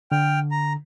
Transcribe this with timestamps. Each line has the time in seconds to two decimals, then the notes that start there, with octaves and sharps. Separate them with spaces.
0.12 D3 G5 F6
0.51 A#5